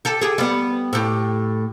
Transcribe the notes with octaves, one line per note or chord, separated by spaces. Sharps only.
G4 A4
G4 G#4
G3 B3
A2 G4